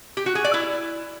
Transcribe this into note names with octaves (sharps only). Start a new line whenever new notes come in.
G4
F#4
G#4
D5
E4